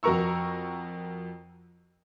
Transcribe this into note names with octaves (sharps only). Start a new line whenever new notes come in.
F2 F#4 A#4 A#5 C#6 E6